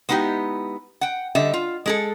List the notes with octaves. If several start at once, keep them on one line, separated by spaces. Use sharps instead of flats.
G#3 B3 D#4 E4 G4
F#5 G5
D3 G3 D#5 E5
F4
G#3 G#4 A4